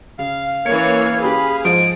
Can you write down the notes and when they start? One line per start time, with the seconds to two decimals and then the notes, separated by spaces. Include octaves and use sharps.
0.19 C#3 F5
0.66 E3 A#3 C#4 C#5 G#6 C#7
1.22 C#4 G4 G#4 B4 B5
1.65 G#2 F3 G#3 C5 D7